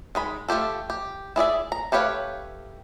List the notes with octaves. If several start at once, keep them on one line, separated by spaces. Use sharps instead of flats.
D#3 G#3 B5
A3 F4 G4 A4
G4
E4 G#4 D5 E5
A#5
A3 G4 B4 C#5 F5